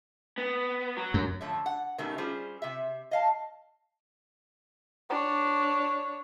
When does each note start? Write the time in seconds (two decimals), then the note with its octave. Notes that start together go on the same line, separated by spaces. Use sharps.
0.38 B3
0.97 F#3
1.14 F#2
1.41 D3 F3 A3 C#5
1.66 F#5
1.98 B2 D#3 F#3 G3 A3 C#4
2.18 G3 C#4 F4 G#4 C5
2.62 C3 E5
3.11 D#5 F5 A5
5.10 D4 C#5